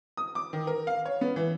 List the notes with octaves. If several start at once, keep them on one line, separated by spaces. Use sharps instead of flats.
D#6
D6
D#3
A#4
F5
C#5
B3
E3